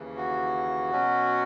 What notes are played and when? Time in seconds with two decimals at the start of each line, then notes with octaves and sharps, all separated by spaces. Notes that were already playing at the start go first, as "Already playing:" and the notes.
Already playing: D#2 C#3 E3
0.17 F#4
0.91 B2 F#3 C#4